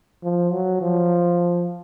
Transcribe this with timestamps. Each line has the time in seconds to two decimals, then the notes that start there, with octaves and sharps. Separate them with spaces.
0.23 F3
0.52 F#3
0.81 F3